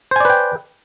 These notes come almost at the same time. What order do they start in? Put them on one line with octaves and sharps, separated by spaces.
C5 G#5 D5 B4 G5